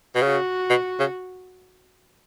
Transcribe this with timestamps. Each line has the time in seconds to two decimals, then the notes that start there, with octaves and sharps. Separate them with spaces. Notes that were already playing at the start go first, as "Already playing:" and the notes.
0.15 B2
0.22 C#3 F#4
0.69 B2
1.00 C#3